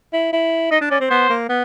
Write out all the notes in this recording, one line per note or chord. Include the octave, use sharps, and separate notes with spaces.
E4
E4
D#4 D#5
D4
C#4 D5
C4
B3 C5
A#3
B3